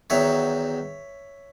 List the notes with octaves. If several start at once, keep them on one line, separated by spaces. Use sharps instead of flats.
E2 D#3 F#3 C#5 E5